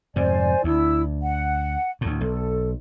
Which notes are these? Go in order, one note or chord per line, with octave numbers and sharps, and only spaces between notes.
F2 G#2 C3 C5 D5 G#5
D2 E4 E6
F#5
D2 A2
B1 A4